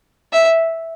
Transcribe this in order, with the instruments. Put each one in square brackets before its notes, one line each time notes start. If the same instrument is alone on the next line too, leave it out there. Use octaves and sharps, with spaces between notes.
[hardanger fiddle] E5